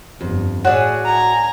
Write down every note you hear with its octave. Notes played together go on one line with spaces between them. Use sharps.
G1 F2
A2 F#4 G#4 C#5 D5 E5
G#5 A#5